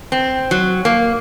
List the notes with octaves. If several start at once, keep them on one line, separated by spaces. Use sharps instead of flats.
C4
F#3
A#3